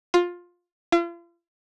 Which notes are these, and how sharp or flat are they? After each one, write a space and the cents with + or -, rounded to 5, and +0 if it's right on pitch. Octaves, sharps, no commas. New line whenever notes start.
F4 +15
F4 -40